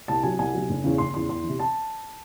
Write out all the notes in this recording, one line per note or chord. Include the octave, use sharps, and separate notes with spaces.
C2 A5
C3 F#3 G#5
C2 G#5
C3 F#3
F#1
E2 C#3
F#1 C6
E2 C#3 C6
E2 C6
E3
C3
A5